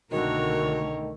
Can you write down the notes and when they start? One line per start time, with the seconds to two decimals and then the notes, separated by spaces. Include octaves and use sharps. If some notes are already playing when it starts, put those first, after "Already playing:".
0.12 C2 B2 D3 D#3 A3 F#4 A#4 C#5